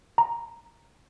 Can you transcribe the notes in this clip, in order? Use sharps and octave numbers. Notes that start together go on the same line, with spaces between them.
A#5